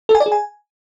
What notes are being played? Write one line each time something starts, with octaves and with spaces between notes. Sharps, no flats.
A4
G#5
D5
G#4
G#5